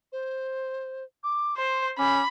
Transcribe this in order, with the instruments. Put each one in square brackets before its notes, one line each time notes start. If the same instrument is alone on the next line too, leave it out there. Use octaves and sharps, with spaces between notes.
[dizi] C5
D6
[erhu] C5 [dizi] C6
[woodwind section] C#4 [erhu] B5 [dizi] D6